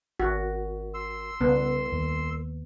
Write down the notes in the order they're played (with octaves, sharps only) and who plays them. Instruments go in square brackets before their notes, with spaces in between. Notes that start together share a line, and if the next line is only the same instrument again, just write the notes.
[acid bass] G#1 [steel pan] F#4
[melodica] C6 E6
[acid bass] C2 [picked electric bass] C#3 [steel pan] B3
[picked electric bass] D#2